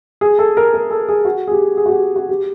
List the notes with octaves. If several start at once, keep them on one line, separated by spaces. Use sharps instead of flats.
G#4
A4
A#4
A#4
A4
G#4
F#4
G#4
G4
G#4
F#4
G4
F#4
G4